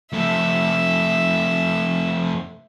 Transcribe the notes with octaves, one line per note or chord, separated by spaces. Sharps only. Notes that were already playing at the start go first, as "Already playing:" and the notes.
F2 A3 E5